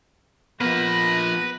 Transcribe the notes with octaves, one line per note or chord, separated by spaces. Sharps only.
F3 A#3 B3 B4 A#6